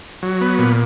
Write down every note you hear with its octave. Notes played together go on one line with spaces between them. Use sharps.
F#3
B3
A#2